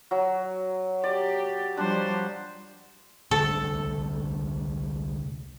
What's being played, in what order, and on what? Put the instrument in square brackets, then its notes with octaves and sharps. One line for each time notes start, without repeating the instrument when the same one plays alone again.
[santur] F#3
[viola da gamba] G4 [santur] D5
[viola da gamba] F3 G3 C5 [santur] D4
[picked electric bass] C2 D3 A3 [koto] A4